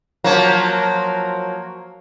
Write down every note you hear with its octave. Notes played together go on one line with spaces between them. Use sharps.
F3 F#3 A#3